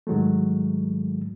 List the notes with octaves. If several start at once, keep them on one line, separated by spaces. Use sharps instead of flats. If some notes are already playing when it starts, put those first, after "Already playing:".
G#2 D#3 F#3 G#3 A3